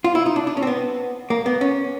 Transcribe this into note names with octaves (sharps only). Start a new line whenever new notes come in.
F4
E4
D#4
D4
D4
C#4
C4
B3
A#3
B3
C#4